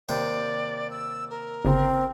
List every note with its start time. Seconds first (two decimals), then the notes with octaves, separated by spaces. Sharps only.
0.09 D#2 C3 D5 G5
0.90 E6
1.30 A#4
1.65 G1 C#3 C4